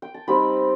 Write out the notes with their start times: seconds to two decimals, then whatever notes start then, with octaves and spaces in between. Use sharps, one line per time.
0.02 G5
0.14 A5
0.27 G3 C4 D#4 G5 B5